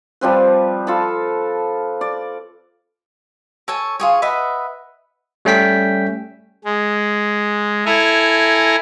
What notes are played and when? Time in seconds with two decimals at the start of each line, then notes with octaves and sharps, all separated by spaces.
0.21 F3 G3 C4 B4
0.87 F4 A4 A5 B5
2.01 D5
3.68 A4 C#5 G#5
4.00 F4 G#4 C#5
4.22 B4 D#5 E5 F#5
5.45 G3 A3 C#4 G5 B6
6.64 G#3
7.86 E4 A4 G#5 A#5